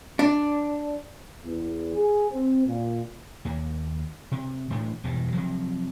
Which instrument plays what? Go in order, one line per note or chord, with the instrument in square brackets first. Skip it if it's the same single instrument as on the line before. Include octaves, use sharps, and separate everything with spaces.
[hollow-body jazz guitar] D4
[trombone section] E2
G#4
C4
A#2
[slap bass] D#2 A#3
C3
A1 A2 A3 D4
E1 E2 G2
C3 F3 F#3